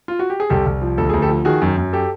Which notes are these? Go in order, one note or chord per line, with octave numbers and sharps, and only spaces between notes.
F4
F#4
G4
G#4
C2 G4 A4
C2
F3
D2 A4
D2 G#4
G4 A4
F3
D#3 F#4 G#4
F#2
F#2
G4 A4